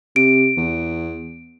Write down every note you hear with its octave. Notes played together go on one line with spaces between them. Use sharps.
C3 D7
E2